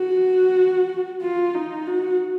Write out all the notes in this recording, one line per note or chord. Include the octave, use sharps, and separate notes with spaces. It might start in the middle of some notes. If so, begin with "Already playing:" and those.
Already playing: F#4
F4
D#4
F#4